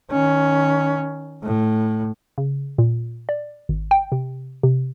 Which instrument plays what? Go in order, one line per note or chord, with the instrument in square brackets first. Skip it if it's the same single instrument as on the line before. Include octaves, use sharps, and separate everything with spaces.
[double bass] D#3 C#4
A2
[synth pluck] C#3
A#2
D5
G#1
G5
C3
C3